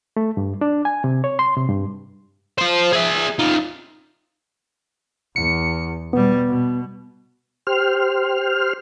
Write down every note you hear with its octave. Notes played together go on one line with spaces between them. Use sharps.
A3
G2
D4
G#5
C3
C#5
C6
C3
G2
F4 C5
G#4 E5
D#4 F4
E2 C#7
B2 G3 B3
B2
G4 C5 F6